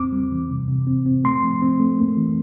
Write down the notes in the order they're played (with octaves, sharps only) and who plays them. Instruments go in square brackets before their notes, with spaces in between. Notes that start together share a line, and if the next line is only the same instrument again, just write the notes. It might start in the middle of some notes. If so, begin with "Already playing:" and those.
Already playing: [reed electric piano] E2 C4 D6
G3
E3
C3
C3
C4
C4
A3 C6
F3
C4
A3
A#3
E3